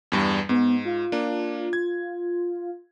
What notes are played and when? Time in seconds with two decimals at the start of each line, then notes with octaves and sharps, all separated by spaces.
0.12 E2 G2 G3
0.49 G#2 B3
0.85 F4
1.12 A#3 D4
1.73 G#6